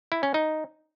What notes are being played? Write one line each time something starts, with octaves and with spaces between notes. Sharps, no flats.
E4
C#4
D#4